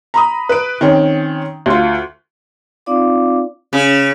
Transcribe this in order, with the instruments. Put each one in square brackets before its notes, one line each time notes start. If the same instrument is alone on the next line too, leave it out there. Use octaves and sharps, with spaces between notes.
[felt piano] A#5 B5 D#6
B4 D7
D#3 C4 C#4 G5
D2 F4
[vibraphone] C4 D#4 F4 D5 F5 D6
[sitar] C#3